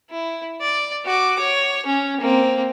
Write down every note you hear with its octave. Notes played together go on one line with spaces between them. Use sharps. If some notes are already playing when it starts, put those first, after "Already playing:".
E4
D5
F#4 D6
C#5
C#4
A#3 C4